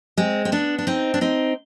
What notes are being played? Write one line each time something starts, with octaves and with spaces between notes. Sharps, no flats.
G#3 C4
C4
B3 D4
D4
C4 D#4
D4
C4 D#4